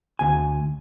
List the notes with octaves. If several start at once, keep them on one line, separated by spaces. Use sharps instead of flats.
D2 G#5